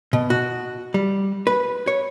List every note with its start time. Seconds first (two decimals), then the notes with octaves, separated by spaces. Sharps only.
0.13 B2
0.30 F#4
0.94 G3
1.47 B4
1.87 C#5